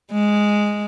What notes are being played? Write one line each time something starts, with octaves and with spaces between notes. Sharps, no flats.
G#3